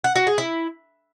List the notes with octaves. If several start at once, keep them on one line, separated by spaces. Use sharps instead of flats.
F#5
F#4
G#4
E4